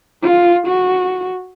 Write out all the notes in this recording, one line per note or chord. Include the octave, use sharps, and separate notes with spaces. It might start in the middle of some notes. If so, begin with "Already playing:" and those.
F4
F#4